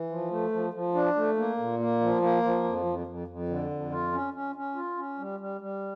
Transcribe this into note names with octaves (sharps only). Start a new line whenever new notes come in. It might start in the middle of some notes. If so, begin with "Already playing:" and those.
Already playing: E3
F3
A3
F3
F3
D4
A3
A#3
A#2
A#3
F3
A#3
F3
F2
F2
F2
F2
D3
F2
F4
C#4
C#4
C#4
F4
C#4
G3
G3
G3